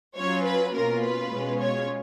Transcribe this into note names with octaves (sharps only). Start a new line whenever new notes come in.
F#3 C#4 F4 C#5
B4
B2 A#3 C#4 F4 A#4
B4
B2 G#3 C#4 F4
C#5